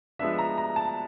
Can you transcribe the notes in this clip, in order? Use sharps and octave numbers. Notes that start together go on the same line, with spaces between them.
F3 G#3 B3 D4 E5
A#5
A#5
A5